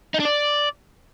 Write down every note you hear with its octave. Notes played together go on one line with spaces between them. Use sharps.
D#4
D4
D5